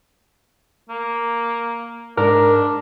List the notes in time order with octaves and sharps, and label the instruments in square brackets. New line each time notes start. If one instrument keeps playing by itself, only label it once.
[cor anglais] A#3
[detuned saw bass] G#2 [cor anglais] D4 [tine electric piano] A#4